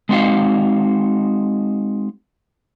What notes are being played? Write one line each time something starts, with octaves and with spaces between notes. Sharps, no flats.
G#3 C4 D#4 F#4 F5